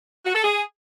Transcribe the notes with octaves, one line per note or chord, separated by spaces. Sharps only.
F#4
A4
G#4